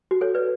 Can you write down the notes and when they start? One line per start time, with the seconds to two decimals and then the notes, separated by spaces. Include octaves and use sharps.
0.11 F#4
0.21 A4 C#5
0.34 B4 D5